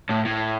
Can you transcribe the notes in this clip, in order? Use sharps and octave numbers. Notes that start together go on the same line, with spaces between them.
A2
A2